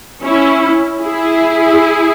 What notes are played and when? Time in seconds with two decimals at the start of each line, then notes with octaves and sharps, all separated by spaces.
0.24 C#4 E4
1.01 E4 G#4